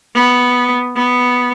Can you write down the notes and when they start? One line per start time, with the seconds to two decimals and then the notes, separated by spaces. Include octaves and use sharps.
0.15 B3
0.96 B3